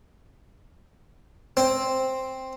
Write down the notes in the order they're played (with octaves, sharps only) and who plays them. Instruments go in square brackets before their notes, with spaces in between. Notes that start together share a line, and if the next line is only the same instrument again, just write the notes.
[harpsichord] C4